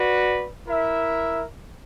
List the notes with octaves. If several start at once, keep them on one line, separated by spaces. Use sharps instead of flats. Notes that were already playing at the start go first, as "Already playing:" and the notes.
Already playing: F#4 B4 D5
E4 A#4 E5